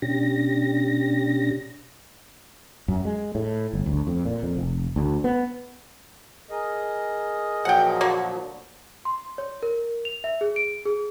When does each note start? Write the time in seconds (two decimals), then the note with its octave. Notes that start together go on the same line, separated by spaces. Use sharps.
0.02 B2 C#4 D4 G4 A#6
2.88 F#2
3.05 G#3
3.35 A2
3.73 G1
3.86 D2
4.07 F2
4.25 A#2
4.43 F2
4.57 F1
4.96 D2
5.24 B3
6.50 G#4 A#4 D#5
7.65 A#2 F3 F#3 F#5 G5
8.01 D3 A#3 F#4
9.05 C6
9.38 C#5
9.63 A#4
10.05 F7
10.24 E5
10.41 G#4
10.56 D7
10.86 G#4